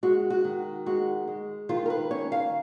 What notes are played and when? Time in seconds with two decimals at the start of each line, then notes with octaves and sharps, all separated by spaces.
0.03 G#3 F#4
0.30 F#4
0.44 D#3
0.86 G#3 F#4
1.27 G#3
1.69 D#3 F4
1.86 A#4
1.90 B4
2.11 C#4 C#5
2.32 F5